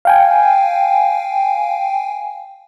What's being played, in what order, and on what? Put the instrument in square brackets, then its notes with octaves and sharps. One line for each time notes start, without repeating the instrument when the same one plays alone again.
[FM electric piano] F5 G5 G#5